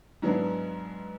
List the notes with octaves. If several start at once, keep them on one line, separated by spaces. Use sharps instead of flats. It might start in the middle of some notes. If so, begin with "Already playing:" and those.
G#2 F#3 B3 D4 E4